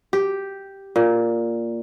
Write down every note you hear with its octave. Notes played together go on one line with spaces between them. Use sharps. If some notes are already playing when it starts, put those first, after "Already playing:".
G4
A#2